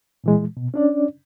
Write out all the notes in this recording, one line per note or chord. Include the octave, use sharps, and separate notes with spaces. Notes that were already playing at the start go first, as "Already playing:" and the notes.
A#2 E3 G#3
B2
C#4 D4 D5